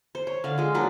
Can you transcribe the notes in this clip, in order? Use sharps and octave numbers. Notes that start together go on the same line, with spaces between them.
C5
C#5
D3 F5
G#3 F4
F#3 A#3 D4 D#4